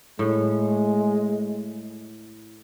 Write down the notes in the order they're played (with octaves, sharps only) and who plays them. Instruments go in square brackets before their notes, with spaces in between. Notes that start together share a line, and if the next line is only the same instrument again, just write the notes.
[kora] A2 [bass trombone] G#3